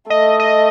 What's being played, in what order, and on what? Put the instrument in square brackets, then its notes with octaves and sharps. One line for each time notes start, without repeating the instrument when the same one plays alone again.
[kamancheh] A3 [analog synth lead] D#5
[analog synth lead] D#5